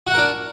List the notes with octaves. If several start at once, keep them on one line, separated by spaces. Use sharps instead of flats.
D4 F#4 A#4 F#5